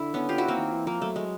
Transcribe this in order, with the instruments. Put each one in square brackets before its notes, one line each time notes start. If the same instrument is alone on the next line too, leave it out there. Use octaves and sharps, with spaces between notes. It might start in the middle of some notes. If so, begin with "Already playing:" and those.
Already playing: [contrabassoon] D3 [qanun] E4
[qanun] B3 C#4
F4 G4
E4 F#4
A#3 C4
[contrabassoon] D#3
E3
[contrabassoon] F3 [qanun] A#3
[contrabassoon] F#3 [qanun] A3
[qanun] G#3